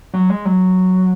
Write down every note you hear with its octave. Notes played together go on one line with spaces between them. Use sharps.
F#3
G#3
F#3